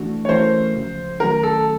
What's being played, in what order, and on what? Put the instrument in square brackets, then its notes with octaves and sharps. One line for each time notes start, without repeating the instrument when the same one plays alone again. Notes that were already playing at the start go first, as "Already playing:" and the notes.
Already playing: [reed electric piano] E3 A3 D4 F#4
[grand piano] C#5
[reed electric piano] E3 A3 C#4 F#4 A#4 [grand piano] C5
[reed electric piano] C#2 C#3 F3
[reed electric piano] D#3 F#3 A3 C#4 F#4 [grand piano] A#4
[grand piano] A4